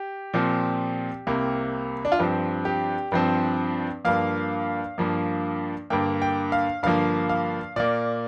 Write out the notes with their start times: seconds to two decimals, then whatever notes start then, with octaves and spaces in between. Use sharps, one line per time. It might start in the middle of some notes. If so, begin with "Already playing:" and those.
Already playing: G4
0.34 A#2 F3 C4
1.27 C2 C3 A#3
2.05 D4
2.12 F4
2.19 G2 F3 C4 G4
2.65 G4
3.12 G2 F3 C4
4.05 G2 F3 A#3 F5
4.98 G2 F3 A#3
5.90 G2 D3 A#3 G5
6.22 G5
6.52 F5
6.83 G2 D3 F3 A#3 F5
7.29 F5
7.76 A#2 A#3 D5